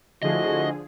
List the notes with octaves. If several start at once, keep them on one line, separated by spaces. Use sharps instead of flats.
D3 F3 A3 E4 F#4 G#4 D#5